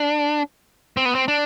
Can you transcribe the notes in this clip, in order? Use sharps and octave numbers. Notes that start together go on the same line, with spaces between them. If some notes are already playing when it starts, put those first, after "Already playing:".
Already playing: D4
C4
B3
C4
D4